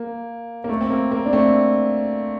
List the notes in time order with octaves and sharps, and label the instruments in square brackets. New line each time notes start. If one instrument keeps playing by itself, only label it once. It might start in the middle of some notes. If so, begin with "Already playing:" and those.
Already playing: [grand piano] A#3
A#3
A3
C4
A#3
A#3
D4
A3 C4